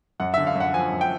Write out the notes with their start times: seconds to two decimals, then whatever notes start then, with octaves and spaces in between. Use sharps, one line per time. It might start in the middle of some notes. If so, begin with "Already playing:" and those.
0.20 F#2 F#5
0.34 D3 E5
0.47 F5
0.55 F#2
0.60 F#5
0.74 F3 G#5
0.92 F#2
1.01 G5